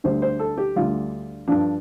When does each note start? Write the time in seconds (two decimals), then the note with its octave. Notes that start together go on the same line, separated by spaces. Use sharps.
0.04 D2 D3 G3 C5
0.22 C5
0.39 A4
0.58 G4
0.76 D2 D3 G3 F4
1.48 G2 F3 D4